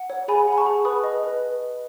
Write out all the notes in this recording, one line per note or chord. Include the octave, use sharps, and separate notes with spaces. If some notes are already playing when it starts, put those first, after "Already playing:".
Already playing: F#5
C#5
G#4 G#5 B5
F#5 B5
A5 C#6
G#4
B4 B5 D#6
D#5
B4